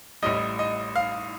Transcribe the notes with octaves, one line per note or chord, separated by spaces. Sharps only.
A1 A2 G3 D#5
D#5
F5